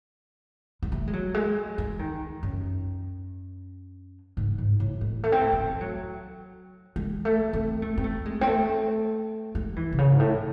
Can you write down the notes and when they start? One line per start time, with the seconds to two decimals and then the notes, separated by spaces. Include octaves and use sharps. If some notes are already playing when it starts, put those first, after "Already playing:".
0.83 G#3
0.92 A3
1.07 G#3
1.13 F#3
1.34 G#3
1.78 G#3
1.99 D#3
2.43 F#2
4.37 G#2
4.58 G#2
4.80 A2
5.01 G#3
5.24 A3
5.32 C4
5.41 A3
5.52 A3
5.81 F#3
6.96 G#3
7.25 A3
7.53 C4
7.82 A3
7.97 C4
8.04 A3
8.25 G#3
8.41 C4
8.47 A3
9.55 G#3
9.76 E3
9.92 C3
9.98 C#3
10.11 G#2
10.19 A2